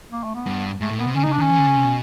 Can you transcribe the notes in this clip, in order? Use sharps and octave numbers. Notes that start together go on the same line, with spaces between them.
A#3
A3
B3
G2
G#2 A3
A2
A#2 B3
C3
D3 C#4
D#4
C#3
D4
D#3 C#4
E3
D3
C#3
C3
B2